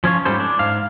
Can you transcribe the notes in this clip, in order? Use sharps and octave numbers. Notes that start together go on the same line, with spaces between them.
F3 C#4 F4 C#5
G#2 G3 C#4 A4 C5
D4
G#2 F5